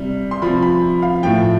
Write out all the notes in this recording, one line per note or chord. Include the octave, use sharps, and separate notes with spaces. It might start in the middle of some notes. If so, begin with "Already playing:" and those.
Already playing: C3 G3
C6
C3 F3 B5
B5
F5
A2 F3 G5